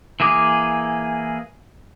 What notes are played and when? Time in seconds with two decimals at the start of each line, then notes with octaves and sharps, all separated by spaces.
0.20 E3 A#3 G#4 D6 D#6